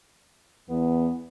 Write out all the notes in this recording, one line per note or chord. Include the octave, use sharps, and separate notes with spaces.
E2 B3